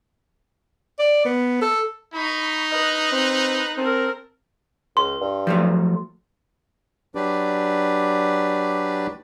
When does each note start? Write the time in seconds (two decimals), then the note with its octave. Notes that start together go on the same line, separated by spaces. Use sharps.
0.99 D5
1.25 B3
1.62 A4
2.14 D#4 B5 C#6
2.72 B4 D#5 F#6
3.12 C4
3.78 C4 A4 A#4
4.97 C#2 C6
5.21 G2
5.47 F3 F#3 A3
7.15 F#3 D4 G4 B4 D5